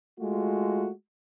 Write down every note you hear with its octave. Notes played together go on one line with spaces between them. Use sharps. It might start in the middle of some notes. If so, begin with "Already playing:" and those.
G#3 A3 F4 F#4